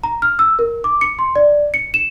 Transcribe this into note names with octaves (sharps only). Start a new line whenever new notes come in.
A#5
F6
E6
A#4
D6
C#7
C6
D5
C#7
E7